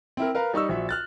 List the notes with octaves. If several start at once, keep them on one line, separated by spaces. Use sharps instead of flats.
C4 E4 A#4
A#4 B4 F5 A#5
G3 D#4 C#6 E6
A#1 F#4 E5
F6 F#6 A6